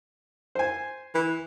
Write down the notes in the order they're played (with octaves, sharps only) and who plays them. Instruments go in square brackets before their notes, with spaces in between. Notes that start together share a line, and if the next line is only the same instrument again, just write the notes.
[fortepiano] C5 G#5
[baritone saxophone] E3